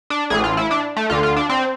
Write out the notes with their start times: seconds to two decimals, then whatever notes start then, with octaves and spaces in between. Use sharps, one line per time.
0.10 D4
0.30 A1 A2 E3 G#4
0.44 F4
0.57 E4
0.71 D4
0.97 A3
1.10 D2 D3 F4
1.23 F4
1.36 D4
1.49 C4